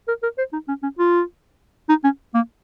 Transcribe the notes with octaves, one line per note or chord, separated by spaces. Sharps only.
A#4
A#4
C5
D#4
C#4
C#4
F4
D#4
C#4
A#3